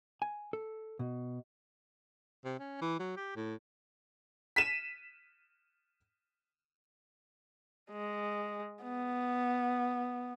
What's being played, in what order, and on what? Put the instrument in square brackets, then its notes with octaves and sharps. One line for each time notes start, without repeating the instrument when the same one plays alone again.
[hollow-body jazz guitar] G#5
A4
B2
[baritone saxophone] C3
C#4
E3
F#3
G4
A2
[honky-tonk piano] B6 D#7 E7
[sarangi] G#3
B3